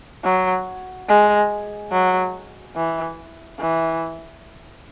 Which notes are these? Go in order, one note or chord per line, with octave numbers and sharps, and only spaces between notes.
F#3
G#3
F#3
E3
E3